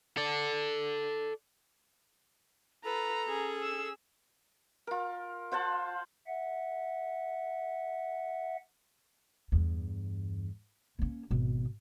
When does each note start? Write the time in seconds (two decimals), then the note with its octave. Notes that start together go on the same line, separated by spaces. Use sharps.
0.17 A4 D5
2.84 F4 A4 B4 A#5
3.26 C#4 G#4
3.63 E6
4.87 F4 A#4
5.51 F4 C5 F#5 A5
6.27 E5 F#5
9.52 E2 G2
10.99 A#3 C#4
11.31 G#1 B2